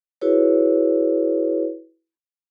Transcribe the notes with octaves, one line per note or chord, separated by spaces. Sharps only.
E4 F#4 G#4 B4 C#5